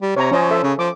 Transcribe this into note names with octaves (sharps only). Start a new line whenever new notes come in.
G3
C3 C#5 A#5
F3 C#4 C#5 D#5
A4 E5
C#3
F3 D6